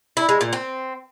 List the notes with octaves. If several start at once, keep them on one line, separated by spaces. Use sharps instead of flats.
E4
G#3
A#2
C4